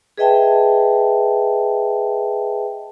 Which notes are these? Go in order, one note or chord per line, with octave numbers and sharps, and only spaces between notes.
G#4 B4 D#5 E5 G5 A5